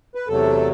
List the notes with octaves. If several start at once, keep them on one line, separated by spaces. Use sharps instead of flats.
B4
E2 C3 F#3 A3 A4